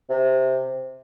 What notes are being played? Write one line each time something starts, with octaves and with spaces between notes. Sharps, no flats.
C3